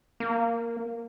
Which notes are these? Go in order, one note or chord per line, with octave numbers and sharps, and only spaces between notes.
A#3